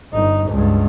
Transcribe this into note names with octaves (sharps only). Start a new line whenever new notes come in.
G1 D#4
C#2 G2